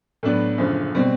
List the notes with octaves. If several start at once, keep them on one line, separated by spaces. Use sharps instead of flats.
A2 F#3 B3 D4
F#1 F#2 D3 F3
B2 G3 C4